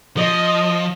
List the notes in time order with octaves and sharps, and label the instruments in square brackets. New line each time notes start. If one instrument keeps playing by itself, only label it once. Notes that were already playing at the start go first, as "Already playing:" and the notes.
[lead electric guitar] F3 [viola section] D#5